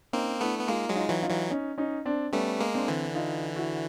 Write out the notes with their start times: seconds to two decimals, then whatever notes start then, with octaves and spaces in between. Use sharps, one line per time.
0.13 A#3 C4 C#4 D#4
0.40 A3 B3 D4 E4
0.59 B3
0.68 G#3 A#3 D#4 F4
0.89 F#3 G#3
0.96 D#4 F4
1.09 E3 F#3
1.23 D#4 F4
1.30 E3 F#3
1.50 C#4 D#4
1.78 C#4 D#4
2.05 C4 D4
2.33 G3 A3 B3 C#4
2.60 G#3 A#3
2.75 C4 D4
2.88 D3 E3
3.15 D#4 F4
3.56 E4 F#4